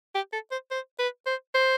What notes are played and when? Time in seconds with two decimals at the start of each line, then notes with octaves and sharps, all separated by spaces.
0.15 G4
0.33 A4
0.51 C5
0.71 C5
0.99 B4
1.27 C5
1.55 C5